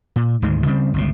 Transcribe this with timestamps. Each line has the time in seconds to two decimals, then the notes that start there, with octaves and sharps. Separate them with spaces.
0.16 A#2
0.42 D2 G#2 D#3 G#3
0.66 C#3 G3 C4
0.94 G1 C#2 A2